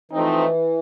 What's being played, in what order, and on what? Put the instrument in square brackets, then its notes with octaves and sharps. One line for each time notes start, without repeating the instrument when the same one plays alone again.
[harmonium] E3 [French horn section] F3 A3 C4 D#4